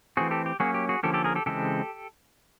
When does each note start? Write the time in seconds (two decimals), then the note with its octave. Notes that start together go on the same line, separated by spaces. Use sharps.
0.17 E3 A3 C4 F#4 G#4
0.31 G4 A4
0.46 G4
0.60 F#3 A#3 C#4 F#4 G#4
0.74 G4
0.89 F#4 G#4
1.03 D3 F3 A#3 C#4 G4 A4
1.14 G4 A4
1.24 G#4 A#4
1.35 G4 A4
1.46 C#3 E3 G#3 C4 G4 A4